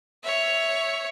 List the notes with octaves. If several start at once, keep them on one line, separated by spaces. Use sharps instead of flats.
C#5 E5